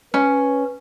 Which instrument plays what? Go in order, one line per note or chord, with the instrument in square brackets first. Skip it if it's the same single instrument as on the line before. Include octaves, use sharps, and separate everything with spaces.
[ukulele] C#4 [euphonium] B4